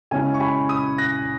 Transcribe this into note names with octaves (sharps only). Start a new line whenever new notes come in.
C#3 G#3 C#4 E4 G#5
C#6
G#5 B5
B5 D#6
F#6 A#6